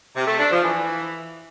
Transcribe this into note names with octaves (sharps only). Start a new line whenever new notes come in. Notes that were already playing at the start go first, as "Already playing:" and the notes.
C3
A3
D4
F3
E3